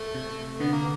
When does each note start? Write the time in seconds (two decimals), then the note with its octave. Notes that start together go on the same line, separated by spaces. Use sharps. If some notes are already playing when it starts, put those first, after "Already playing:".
Already playing: A3
0.15 C3
0.60 D3 B3
0.72 A#3